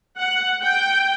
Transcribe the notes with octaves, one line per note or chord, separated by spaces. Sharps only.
F#5
G5